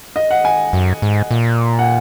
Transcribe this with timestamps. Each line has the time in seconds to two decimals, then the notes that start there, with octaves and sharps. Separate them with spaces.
0.16 D#5
0.31 F#5
0.45 G#5
0.73 F#2
1.02 G#2
1.31 A#2
1.79 F#5